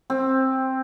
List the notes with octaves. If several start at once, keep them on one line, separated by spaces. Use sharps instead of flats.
C4